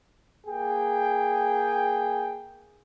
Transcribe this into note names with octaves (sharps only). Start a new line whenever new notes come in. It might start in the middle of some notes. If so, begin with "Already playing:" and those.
A#3 G#4 G5